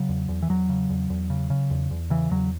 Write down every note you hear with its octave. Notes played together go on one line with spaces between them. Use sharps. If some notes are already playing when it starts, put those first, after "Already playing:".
Already playing: C#3 F#3
E2
E2
E3
E2 F#3
C#3
E2
E2
C#3
C#3
E2
E2
C#3 E3
E2 F#3